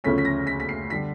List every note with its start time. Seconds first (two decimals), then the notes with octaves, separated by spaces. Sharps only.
0.04 D2 C#3 F3 A3 C#4 B6
0.18 B6
0.25 A#6
0.47 B6
0.60 B6
0.69 C7
0.90 D3 G3 B6